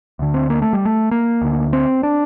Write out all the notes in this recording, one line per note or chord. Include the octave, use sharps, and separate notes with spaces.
D2 D3
C4
A#3
A3
G3
A3
A#3
D2 D3
C4
D4